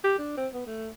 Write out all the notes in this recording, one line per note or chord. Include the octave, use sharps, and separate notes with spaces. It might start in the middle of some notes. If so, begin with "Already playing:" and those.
G4
D4
C4
B3
A3